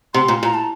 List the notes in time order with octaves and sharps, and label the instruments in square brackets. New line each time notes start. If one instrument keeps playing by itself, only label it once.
[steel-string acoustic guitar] C3 [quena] C6
[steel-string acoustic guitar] A#2
[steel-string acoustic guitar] A#2 [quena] A#5
[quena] A5